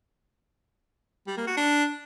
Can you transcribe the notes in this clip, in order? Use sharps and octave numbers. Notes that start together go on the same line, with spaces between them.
G3
A#3
F#4
D4